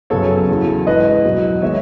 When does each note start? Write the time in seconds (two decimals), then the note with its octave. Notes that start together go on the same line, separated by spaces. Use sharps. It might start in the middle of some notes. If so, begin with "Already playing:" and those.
0.10 F#2 C#3 F#3 B3 A4 C#5
0.48 E2 C#3 F#3
0.86 G#2 E3 G#3 B4 D#5
1.24 E2 B2 F#3
1.62 D#3 G#3 B3 C#5 E5